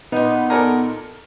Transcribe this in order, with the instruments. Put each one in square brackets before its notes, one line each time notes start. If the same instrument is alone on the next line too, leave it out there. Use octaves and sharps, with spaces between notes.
[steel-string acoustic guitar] A#2 D#4 [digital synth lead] B3
[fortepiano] A4 D5 G#5 [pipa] A#4